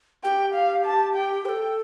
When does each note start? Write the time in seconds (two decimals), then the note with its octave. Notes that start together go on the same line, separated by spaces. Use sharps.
0.24 G4 G5
0.54 F5
0.85 A5
1.15 G5
1.45 A4 C5 G5